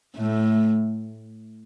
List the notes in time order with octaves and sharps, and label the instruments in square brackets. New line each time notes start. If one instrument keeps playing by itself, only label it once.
[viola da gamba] A2 [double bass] A3